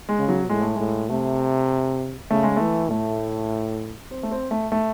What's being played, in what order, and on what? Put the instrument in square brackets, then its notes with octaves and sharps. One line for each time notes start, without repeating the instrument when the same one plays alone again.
[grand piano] G#3
[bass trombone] C#3
[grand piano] F#3
[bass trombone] A2 [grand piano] G#3
[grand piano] A3
[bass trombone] A2 [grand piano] G#3
[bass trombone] C3 [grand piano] A3
[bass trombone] C#3 [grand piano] A3
[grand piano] G#3
[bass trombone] E3 [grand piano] A3
[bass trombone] A2 [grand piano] A3
[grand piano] C4
A3
C4
A3
A3